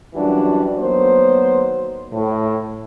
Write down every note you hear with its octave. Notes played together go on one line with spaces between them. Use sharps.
F#2 E3 G3 D4 F4 F#4
D#3 F#3 A#3 B3 C5
A2